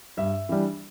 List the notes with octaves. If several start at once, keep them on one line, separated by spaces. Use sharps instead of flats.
G2 E5
E3 G3 D4